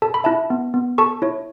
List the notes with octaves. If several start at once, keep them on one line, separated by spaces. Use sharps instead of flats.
A4 A5
B5
E4 E5 A5
B3
B3
A4 A5 C#6
E4 C#5